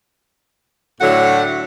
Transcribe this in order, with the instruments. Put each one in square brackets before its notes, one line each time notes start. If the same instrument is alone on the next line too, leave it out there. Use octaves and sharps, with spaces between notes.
[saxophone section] A2 D3 F#3 A3 F#5